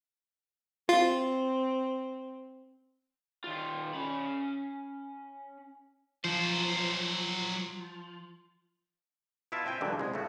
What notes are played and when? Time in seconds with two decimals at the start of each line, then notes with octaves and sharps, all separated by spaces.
0.89 C4 F4
3.44 D#3 F4
3.93 C#4 B5
6.24 F3 F#3 C5
9.52 B2 E4 F4 E5 A5
9.66 C4 E5 G5 G#5
9.81 C#2 G2 B2 D3 E3 F#3
9.99 C2 G#3
10.14 A2 C#3 A3 F#4